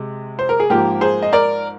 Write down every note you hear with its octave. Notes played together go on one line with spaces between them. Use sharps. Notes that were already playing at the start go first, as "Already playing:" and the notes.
Already playing: C3 G#3
C5
A#4
G#4
G#2 F3 A#3 G4 A#4
G#4 C5
D#5
A#4 D5